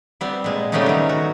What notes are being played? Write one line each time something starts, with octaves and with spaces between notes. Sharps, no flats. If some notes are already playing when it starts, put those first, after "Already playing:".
G3 B3 C4
A#2 G#3
C#3 G3 A3 B3 C#4 D#4
D#3 F#3
F#4